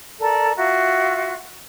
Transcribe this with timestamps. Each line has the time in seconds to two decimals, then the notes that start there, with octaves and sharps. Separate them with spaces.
0.20 A4 A#4 D5
0.57 F4 F#4 E5